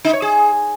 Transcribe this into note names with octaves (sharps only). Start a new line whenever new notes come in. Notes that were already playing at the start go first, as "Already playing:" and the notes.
D#4
C#5
G#4